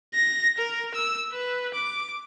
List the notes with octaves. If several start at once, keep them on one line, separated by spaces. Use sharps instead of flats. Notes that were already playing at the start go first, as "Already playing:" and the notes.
A#6
A#4
E6
B4
D6